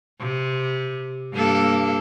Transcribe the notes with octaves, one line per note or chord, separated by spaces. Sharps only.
C3
G2 A#3 A4